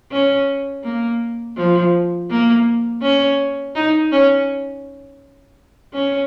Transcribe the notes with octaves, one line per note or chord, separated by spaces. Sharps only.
C#4
A#3
F3
A#3
C#4
D#4
C#4
C#4